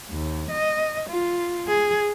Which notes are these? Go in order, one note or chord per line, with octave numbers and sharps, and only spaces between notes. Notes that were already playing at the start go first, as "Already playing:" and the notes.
D#2
D#5
F4
G#4